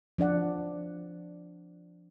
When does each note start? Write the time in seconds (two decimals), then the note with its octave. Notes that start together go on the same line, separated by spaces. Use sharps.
0.18 F3 D4 D5 F#5